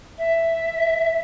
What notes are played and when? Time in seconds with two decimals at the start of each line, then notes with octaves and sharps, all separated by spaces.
0.18 E5